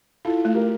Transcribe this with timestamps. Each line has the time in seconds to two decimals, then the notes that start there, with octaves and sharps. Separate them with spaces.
0.25 E4 F4 A4
0.45 A3
0.55 G4 A#4